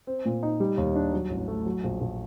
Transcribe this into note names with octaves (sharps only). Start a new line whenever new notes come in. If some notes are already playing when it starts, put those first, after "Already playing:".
C4
A#2
D#4
G3
D#2
D4
F#3
A1
A3
F#3
A#1
A#1